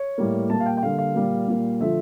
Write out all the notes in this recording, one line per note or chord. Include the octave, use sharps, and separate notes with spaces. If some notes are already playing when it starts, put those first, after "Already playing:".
Already playing: C#5
A2 G3 A#3
A#2 G3 A#3 A5
F5
G5
G5
D3 G3 A#3 F5
F5
A#2 G3 A#3
A#2 G3 A#3
D3 F3 A3 E5